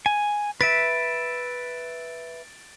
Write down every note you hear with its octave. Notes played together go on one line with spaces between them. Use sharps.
G#5
B4 E5 A6 D7